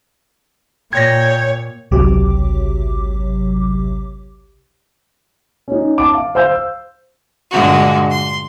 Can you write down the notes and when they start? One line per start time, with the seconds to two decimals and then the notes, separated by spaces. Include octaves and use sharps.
0.93 A#2 C#5 G5 G#6 A#6
1.91 G#1 C#2 C3 F#3 G4 D6
5.68 C#4 D#4
5.98 A5 D6
6.15 F5
6.35 C5 F5 E6 G6
7.50 G2 A#2 D3 G#3 A#3 F#4
8.10 C6